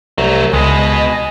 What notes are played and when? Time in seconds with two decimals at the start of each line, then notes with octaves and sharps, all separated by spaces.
0.18 C2 F#3 A3
0.53 C#2 B2 G#3 B3 D#5 G#5